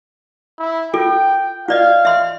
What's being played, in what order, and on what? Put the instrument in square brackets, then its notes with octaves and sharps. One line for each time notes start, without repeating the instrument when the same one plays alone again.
[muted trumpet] E4
[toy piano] F4 A4 [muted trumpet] G5
[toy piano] F4 D5 D#5 [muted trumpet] F5
[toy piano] E5 C6